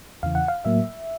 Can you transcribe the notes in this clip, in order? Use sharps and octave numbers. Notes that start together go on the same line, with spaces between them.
E2 C#3 E3 F5
F#5
F5
A2 F#3 A#3 E5